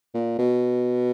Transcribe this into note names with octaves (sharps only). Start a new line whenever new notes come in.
A#2
B2